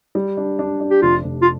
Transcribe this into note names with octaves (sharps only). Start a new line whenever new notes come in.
G3
D4
D4
D4
G4
F1 F4
F1
F4